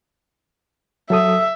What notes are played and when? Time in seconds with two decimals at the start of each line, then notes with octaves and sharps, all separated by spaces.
1.10 F#3 A4 E5 D#6